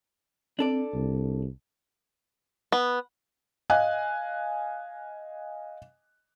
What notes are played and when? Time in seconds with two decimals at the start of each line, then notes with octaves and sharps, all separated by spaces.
0.59 C4 D4 A4 D5
0.94 C2
2.72 B3
3.70 D#5 F5 G#5 F#6